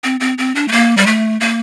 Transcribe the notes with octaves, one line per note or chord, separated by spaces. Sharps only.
C4
C4
C4
D4
A3
A#3
G3
A3
A#3